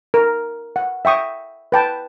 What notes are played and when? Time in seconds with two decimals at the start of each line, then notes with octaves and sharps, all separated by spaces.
0.14 A#4
0.76 F#5
1.05 E5 G5 C#6 D#6
1.72 B4 G5 A5